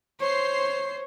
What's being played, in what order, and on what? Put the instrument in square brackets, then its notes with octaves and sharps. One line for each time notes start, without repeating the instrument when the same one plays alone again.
[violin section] C5 C7 [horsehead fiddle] C#5